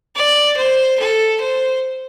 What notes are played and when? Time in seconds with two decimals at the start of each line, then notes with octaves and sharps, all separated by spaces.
0.16 D5
0.57 C5
0.99 A4
1.40 C5